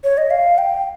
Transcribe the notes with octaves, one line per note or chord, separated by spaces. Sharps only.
C#5
D#5
F5
G5